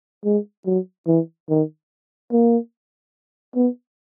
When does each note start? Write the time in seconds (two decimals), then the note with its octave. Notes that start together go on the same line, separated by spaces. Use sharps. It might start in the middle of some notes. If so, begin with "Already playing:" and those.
0.25 G#3
0.66 F#3
1.07 E3
1.50 D#3
2.32 A#3
3.55 B3